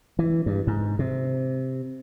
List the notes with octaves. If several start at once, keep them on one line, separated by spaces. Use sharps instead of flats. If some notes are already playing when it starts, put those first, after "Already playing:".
E3
G2
G#2
C3